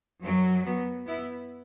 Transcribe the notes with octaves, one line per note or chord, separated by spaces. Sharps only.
F#2 F#3
F#3 B3
B3 E4